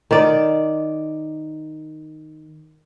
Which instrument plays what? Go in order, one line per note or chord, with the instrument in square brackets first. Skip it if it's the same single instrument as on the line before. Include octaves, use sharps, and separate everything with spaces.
[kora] D#3 D5